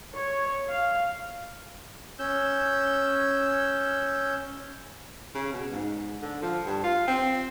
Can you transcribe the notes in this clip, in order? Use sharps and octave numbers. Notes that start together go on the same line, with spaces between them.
C#5
F5
C#4 E6 G6
C#3
B2
G#2
D3
F3
G2
F4
C4